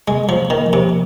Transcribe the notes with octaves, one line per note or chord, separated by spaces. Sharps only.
C3 G#3
F3
A#3
D#3
F3
C3